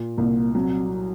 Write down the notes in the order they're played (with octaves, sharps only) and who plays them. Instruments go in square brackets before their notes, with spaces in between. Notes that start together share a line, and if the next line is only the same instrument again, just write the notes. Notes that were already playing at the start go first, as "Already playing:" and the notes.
Already playing: [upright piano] A#2
[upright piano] C2 [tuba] A#3
[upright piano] F#3 [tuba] C4